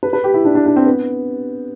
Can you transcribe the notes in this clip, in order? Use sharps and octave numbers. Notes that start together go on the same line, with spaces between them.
B4
B4
G4
E4
D4
D4
D4
C4
B3